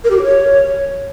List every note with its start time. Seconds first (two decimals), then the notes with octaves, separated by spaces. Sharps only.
0.04 A#4
0.10 G4
0.17 F#4
0.23 C#5